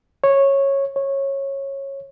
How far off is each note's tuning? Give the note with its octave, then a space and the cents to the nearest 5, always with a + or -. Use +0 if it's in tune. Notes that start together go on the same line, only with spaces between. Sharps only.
C#5 -10
C#5 -15